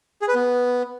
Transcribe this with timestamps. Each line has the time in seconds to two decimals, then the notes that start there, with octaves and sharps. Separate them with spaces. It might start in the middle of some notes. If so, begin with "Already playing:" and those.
0.22 G#4
0.28 B4
0.34 B3